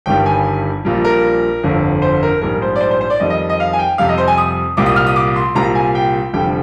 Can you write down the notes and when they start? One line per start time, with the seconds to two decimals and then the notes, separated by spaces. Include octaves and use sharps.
0.06 G1 G2 D#3 G3 G5
0.26 G#5
0.85 A#1 A#2 G3
1.05 A#4
1.64 G1 F2 D3
2.02 C5
2.23 A#4
2.42 A#1 G#2 G3 A#4
2.62 C5
2.76 D5
2.81 C5
2.91 C5
3.01 C5
3.10 D5
3.20 F2 D#3 G3 D#5
3.30 D#5
3.49 D#5
3.60 F5
3.73 G#5
3.79 G5
3.98 F2 C3 G3 F5
4.09 D#5
4.18 C5
4.28 G#5
4.38 D#6
4.77 C2 A#2 G3 D6
4.86 D#6
4.96 F6
5.07 D#6
5.16 D6
5.36 C6
5.55 C2 A#2 G3 A#5
5.75 G#5
5.95 G5
6.33 F1 F2 D3 G3 G5